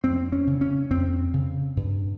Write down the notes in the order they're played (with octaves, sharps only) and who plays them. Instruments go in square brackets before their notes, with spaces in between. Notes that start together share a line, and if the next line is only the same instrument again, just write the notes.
[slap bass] F2 C4
C#4
C#3
C#4
F2 C4
C#3
G2